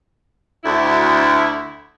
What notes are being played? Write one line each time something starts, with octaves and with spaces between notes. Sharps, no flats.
D2 E4